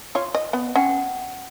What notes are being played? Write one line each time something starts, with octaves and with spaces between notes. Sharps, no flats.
F4 C#5
D#5
B3
C#4 F#5 G5